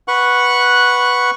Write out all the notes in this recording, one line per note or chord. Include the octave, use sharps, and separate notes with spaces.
B4 F#5 C#6 F#6